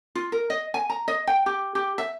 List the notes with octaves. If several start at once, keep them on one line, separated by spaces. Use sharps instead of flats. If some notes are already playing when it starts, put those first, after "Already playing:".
F4
A#4
D#5
G#5
A#5
D#5
G5
G4
G4
E5